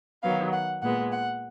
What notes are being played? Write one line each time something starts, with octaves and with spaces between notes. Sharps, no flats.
D#3 F#3 B3 F5
F#5
A#2 G#3 B3 F#5
F#5